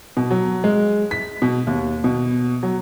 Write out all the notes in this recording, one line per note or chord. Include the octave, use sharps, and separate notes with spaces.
B2
F#3
G#3
B6
B2
D#2
B2
F#3